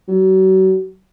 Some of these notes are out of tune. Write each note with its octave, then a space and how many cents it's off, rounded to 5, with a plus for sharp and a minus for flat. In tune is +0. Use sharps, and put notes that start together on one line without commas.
F#3 +35